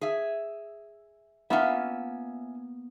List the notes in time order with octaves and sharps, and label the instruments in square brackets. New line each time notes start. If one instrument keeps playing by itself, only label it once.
[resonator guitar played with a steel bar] G#4 E5
[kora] A#3 B3 F4 [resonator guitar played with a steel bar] C#4 E5